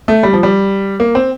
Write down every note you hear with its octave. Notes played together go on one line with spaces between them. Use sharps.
A3
G3
F3
G3
A#3
C4